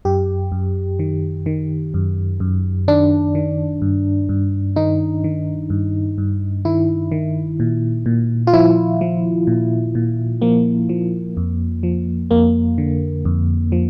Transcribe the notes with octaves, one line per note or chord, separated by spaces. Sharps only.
F#2 G4
F#2
D#3
D#3
F#2
F#2
D#3 D4
D#3
G2
G2
D#3 D#4
D#3
G2
G2
D#3 E4
D#3
A#2
A#2
F4
F3 E4
F3
A#2
A#2
F3 A#3
F3
F2
F3
F2 A#3
D3
F2
F3